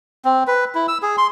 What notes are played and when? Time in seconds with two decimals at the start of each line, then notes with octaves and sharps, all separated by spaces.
0.25 C4
0.47 B4
0.75 E4
0.88 E6
1.02 G#4
1.18 C6